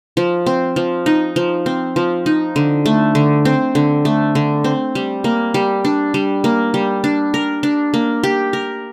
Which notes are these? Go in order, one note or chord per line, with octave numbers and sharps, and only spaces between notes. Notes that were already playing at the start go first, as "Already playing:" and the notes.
F3
C4
F3
D#4
F3
C4
F3
D#4
D3
A3
D3
C4
D3
A3
D3
C4
G3
A#3
G3
D4
G3
A#3
G3
D4
A#4
D4
A#3
G4
A#4